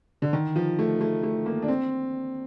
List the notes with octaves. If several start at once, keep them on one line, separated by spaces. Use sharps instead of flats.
D3
D#3
F3
A3
A3
A3
A#3
D4
C4